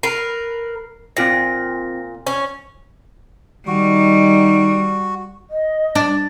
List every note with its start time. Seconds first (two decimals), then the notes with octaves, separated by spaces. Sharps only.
0.03 A#4 B4 C7
1.17 A#2 C4 F4 A#6
2.27 C#4
3.67 D#3 G3 D#4 F#4
5.50 D#5
5.95 D4